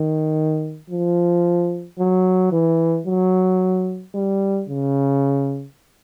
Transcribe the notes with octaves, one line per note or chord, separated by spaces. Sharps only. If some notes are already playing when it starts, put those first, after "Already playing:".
Already playing: D#3
F3
F#3
E3
F#3
G3
C#3